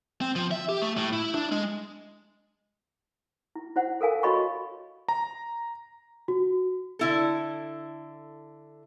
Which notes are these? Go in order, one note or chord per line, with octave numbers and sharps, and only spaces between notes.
C4
F3
E5
G4
A3
A2
E4
D4
G#3
E4
E4 C5 F#5
A4 A#4 F5 G#5
F#4 C#5 D#5 B5 C#6
A#5
F#4
D3 E4 A4